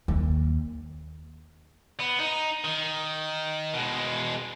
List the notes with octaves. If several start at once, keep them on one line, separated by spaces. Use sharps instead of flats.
D#2
B3
D#4
D#3
B2 G#3